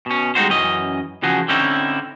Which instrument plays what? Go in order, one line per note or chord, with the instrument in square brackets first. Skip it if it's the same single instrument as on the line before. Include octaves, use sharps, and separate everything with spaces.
[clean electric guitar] B2 C#4
G3 G#3 C4 D#4 F#4 C5
F#2 E3 C#4 D#5
C#3 E3 F3 F#4 G#4
D3 C4 C#4 D#4 E4